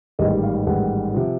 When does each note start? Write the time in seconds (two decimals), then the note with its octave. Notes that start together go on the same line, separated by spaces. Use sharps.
0.19 A1 G#2 D#3 G3 D#5
0.43 F5
0.67 A1 G#2 D#3 G3 F#5
1.14 C3 F3